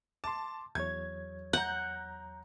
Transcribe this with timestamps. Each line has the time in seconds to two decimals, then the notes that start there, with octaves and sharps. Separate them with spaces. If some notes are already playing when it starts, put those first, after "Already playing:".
0.24 A5 C6 D6
0.75 E2 F#3 C#5 G#6
1.53 F#5 A#5 G6